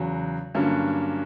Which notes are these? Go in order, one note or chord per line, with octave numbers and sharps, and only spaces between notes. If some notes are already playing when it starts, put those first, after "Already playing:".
Already playing: E2 C#3 F#3
G2 D3 F#3 A#3 C#4